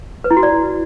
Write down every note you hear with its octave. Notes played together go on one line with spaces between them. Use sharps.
B4
E4
F#4
D5